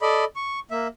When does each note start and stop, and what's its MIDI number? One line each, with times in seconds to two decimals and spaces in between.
0.01 0.24 69
0.01 0.24 74
0.01 0.24 75
0.01 0.24 83
0.36 0.60 85
0.71 0.88 58
0.71 0.88 76